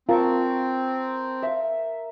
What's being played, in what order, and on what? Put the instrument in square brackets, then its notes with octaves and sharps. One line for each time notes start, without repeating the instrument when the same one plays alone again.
[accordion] C4 [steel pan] F4 [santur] A#4 A5 C#6
[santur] E5 F5